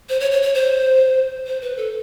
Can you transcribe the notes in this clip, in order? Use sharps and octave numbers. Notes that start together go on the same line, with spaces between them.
C5
C#5
C#5
C#5
C5
C5
B4
A4